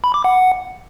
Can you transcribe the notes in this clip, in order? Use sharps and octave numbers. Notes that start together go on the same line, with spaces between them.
B5
D6
F#5